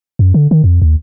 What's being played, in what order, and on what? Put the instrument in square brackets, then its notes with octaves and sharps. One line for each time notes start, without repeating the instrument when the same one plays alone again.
[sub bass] F#2
D3
D#3
F2
D#2